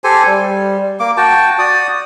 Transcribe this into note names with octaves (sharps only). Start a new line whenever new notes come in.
G4 A4 C5 G#5
G3
A#3 D6
F#4 G5 A5
F#4 D5 D#6